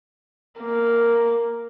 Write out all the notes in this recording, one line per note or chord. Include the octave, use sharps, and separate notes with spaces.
A#3